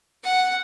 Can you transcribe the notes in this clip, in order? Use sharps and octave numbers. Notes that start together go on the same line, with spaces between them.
F#5